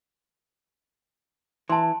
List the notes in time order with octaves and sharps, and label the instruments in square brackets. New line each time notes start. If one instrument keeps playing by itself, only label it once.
[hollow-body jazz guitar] E3 [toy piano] A5 C6